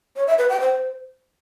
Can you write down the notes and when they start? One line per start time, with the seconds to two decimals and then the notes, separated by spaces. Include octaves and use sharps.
0.16 C#5
0.27 E5
0.38 B4
0.49 G5
0.60 C5